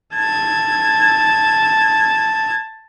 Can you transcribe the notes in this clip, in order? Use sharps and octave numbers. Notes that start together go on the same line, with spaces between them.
A5 G#6